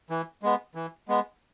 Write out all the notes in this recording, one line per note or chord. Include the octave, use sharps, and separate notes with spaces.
E3
G#3 B3
E3
G#3 B3